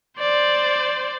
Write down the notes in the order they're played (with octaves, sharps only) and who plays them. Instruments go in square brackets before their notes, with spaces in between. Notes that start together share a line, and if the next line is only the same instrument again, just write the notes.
[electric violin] C5 D5